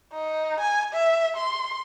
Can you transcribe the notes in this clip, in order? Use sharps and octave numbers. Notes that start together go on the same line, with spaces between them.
D#4
G#5
E5
C6